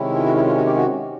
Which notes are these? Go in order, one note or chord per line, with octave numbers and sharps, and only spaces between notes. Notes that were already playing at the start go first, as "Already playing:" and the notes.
Already playing: C3 D#3 G#3 C#4 E4
F4
F#4
E4
F4
F#4
G4
F#4